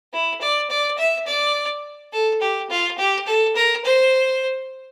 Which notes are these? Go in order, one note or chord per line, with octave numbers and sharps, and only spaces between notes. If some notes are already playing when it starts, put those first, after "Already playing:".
E4
D5
D5
E5
D5
A4
G4
F4
G4
A4
A#4
C5